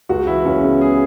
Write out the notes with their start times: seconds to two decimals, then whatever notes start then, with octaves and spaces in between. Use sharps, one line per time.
0.09 C#2 F#4
0.27 E3 E4
0.45 C#2 C#4
0.63 C#3 B3
0.81 G#4